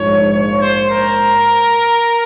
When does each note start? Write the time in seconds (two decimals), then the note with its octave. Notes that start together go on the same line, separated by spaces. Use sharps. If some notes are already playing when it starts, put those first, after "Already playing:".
Already playing: A#1 G#2 F3 C#5
0.32 C#5
0.61 C5
0.89 A#4